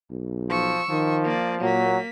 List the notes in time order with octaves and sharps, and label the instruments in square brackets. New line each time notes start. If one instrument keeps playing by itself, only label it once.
[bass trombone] B1
[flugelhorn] F3 [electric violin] C#6 E6
[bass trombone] D#3 [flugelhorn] F3
[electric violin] A#3 D5
[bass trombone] A#2 [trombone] F#3 [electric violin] A#3 B6